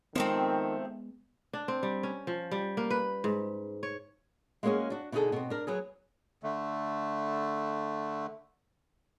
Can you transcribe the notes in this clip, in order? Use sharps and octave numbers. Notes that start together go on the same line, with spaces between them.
D#3 F3 G#3 A3 B3 C4
D4
C4
G3
C#4
F3
G3
A#3
B4
G#2
C#5
G#3 A#3 B3 C#4 F#4 G#4
D4 F#4
B2 D3 D#4 F4 G#4 A4
B2 C4
D4 A#4
F#3 B3 G#4
D3 A3